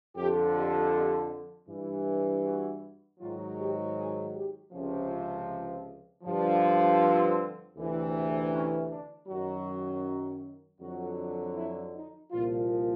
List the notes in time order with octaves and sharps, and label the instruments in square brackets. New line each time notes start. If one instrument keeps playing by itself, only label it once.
[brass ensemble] F2 D3 F3 G4
G4
G2 E3
F#4
G#2 D#3 F#3 F4
G4
G#4
G4
C#2 C3 F3 C#4
G2 D3 F3
C4
D2 C3 E3
C#4
D4
F#2 D#3 F#3 F#4
F2 D3 F#3 F#4
E4
D#4
C2 A#2 F3 F4